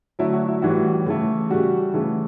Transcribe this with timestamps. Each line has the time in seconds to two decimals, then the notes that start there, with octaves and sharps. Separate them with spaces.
0.19 D3 F#3 A3 E4
0.33 F#4
0.48 E4
0.62 A2 E3 G3 F#4
1.06 C#3 E3 A3
1.50 C#3 G3 F#4
1.94 C#3 E3 A3